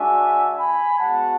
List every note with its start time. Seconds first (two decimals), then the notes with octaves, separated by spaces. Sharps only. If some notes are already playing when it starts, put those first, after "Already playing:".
Already playing: G#3 D4 F#4 E5 G#5
0.59 G#5 B5
0.98 G#3 B3 F#4 F#5 A5